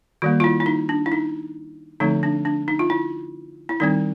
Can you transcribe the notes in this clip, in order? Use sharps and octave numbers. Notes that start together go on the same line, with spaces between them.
D#3 G3 A#3 F#4
F4
E4
E4
D#4
D4
E4
D#4
D3 F3 A3 C4 D#4
D4
D4
D#4
F4
E4
E4
D#3 G3 C4 D#4